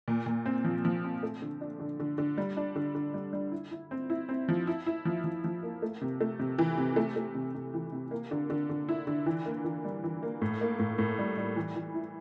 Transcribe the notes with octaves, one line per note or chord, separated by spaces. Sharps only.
A#2
A#2
C4
F3
F3
C4
A3
D3
D4
D3
D3
D3
G3
D4
D3
D3
G3
G3
E4
E4
C4
E4
C4
F3
E4
E4
F3
F3
F3
A#3
A3
C3
A3
C3
E3
C3
A3
A3
C3
C3
E3
C3
A#3
D3
D3
D3
E4
D3
E3
A#3
E3
G3
E3
A#3
A2
A#3
A2
A2
G3
G3
E3
E3
E4